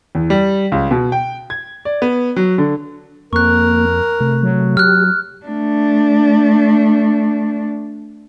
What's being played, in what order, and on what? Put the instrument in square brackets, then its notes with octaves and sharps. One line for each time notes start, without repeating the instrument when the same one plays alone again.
[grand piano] E2
G3
C#2
B2
G5
G#6
D5
B3
F#3
D3
[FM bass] F2 [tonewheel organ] A#3 [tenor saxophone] A#4 [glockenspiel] C#6 F#6
[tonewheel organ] C3 A3
[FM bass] F#3
[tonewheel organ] G4 [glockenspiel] F6 F#6
[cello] A3 D4